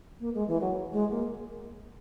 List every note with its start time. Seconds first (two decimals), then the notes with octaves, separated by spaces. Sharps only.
0.20 A#3
0.34 G#3
0.48 E3
0.60 F#3
0.92 G#3
1.10 A#3